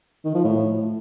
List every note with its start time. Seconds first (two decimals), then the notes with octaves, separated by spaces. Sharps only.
0.24 D#3
0.34 F3
0.44 A2